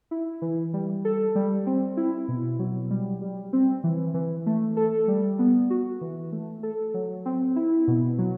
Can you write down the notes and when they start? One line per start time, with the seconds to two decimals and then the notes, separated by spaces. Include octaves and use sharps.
0.11 E4
0.42 E3
0.74 G3
1.05 A4
1.35 G3
1.67 C4
1.97 E4
2.28 B2
2.59 F#3
2.91 G3
3.21 G3
3.53 C4
3.84 E3
4.14 E3
4.46 A3
4.77 A4
5.08 G3
5.39 B3
5.70 F#4
6.01 E3
6.32 A3
6.63 A4
6.94 F#3
7.26 C4
7.56 E4
7.88 B2
8.18 F#3